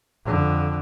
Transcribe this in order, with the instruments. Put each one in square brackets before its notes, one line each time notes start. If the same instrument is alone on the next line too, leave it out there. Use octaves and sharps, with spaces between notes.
[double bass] F2 D3